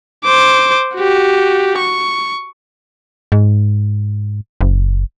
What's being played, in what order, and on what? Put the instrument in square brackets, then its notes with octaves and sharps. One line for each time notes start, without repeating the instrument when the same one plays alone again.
[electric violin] C5 D6
F#4 G4
C#6
[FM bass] G#2
F#1